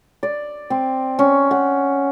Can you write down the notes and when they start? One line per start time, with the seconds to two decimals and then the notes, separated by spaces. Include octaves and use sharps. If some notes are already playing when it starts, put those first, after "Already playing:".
0.23 D5
0.70 C4
1.19 C#4
1.51 F#5